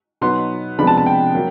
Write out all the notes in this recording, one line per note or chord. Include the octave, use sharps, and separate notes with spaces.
B2 F#3 B3 D#4 C6
C3 F3 G#3 B3 D4 B5
A5
A5
G5
F#3 A#3